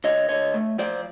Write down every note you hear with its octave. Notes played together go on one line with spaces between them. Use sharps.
D3 C#5 D#5
D3 C#5 D#5
A3
F3 C5 D5